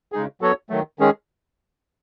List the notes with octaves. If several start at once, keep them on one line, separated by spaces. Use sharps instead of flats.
C#3 G#3 D#4 G#4
F#3 B3 F#4 A4 C#5
D#3 F#3 A3
D#3 G#3 C#4 G#4